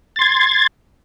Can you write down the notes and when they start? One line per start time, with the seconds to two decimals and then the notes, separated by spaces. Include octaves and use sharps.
0.16 A6
0.19 C6
0.22 G#6